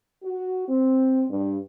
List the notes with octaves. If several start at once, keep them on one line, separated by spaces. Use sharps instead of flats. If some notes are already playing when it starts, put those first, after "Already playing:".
F#4
C4
G2